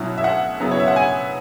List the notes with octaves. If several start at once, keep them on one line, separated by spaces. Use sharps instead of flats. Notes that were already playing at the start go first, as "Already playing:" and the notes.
Already playing: B2 F#3 C#4 E4
E5
F#5
C#3 F#3 B3 E4
C#5
E5
F#5
G#5